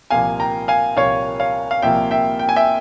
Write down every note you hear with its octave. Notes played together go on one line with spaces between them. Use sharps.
C2 A#2 F3 A#3 F5 G#5
G5 A#5
F5 G#5
C2 A#2 F3 A#3 C#5 F5
C#5 F5
F5
C2 A#2 F3 A#3 E5 G5
E5 G5
G5
G#5
E5 G5